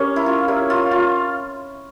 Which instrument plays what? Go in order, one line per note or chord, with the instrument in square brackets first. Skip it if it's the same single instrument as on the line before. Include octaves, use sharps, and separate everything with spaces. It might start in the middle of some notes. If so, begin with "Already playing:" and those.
Already playing: [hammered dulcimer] C#4 [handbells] G4 A#4 C#5
[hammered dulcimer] E4
F4
[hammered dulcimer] E4 [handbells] G4 A#4 C#5
[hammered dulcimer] F4
F4